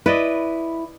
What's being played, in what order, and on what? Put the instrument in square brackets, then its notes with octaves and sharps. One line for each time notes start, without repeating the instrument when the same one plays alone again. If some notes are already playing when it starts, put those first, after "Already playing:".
[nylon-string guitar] E4 [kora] B4 D5 D#5